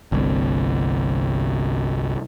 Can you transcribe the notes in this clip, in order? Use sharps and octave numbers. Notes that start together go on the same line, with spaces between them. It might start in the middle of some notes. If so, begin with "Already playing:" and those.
G1 C2